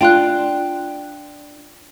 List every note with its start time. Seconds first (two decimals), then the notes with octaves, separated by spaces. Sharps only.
0.01 D4 F4 G5 C6 F#6